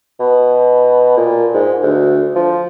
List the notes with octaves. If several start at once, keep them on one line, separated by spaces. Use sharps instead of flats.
B2
A#2
G#2
D2
F3